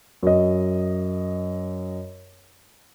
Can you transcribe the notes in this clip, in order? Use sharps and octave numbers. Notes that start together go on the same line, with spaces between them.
F#2 D#5